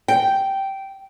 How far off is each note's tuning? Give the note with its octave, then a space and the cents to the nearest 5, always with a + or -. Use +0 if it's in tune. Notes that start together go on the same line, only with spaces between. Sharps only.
G5 -10